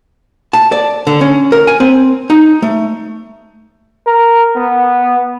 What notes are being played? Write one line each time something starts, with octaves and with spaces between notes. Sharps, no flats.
A5
D5
D3
C#4
A#4
G#5
C4
D#4
A3
A#4
B3